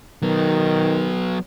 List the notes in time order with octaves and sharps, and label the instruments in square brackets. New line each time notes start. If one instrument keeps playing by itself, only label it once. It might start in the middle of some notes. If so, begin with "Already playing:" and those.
[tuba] D#3 [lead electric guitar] F#3 B3